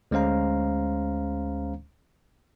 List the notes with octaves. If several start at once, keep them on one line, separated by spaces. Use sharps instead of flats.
D2 G#3 C#4 C5 F5 A#5